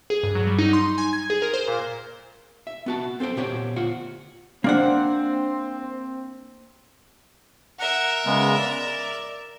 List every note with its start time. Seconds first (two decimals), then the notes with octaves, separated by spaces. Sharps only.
0.10 G#4
0.23 G2
0.35 F#3
0.47 G3
0.59 D#4
0.73 C6
0.98 G#5
1.13 G#6
1.30 G#4
1.42 A#4
1.54 C5
1.68 A#2
2.67 E5
2.86 B3 F#4 A5
3.20 C4 A4 C5 G5
3.37 A#2 B3 G4 C5 C#5 G5
3.76 D2 F4 F#5
4.64 A#3 C4 D4 F#5
7.79 A#4 E5 F#5
8.26 C#3 G#3 B3
8.58 D5